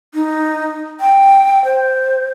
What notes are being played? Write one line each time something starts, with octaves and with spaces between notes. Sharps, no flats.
D#4
G5
C5